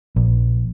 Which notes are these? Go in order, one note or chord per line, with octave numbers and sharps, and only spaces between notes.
A#1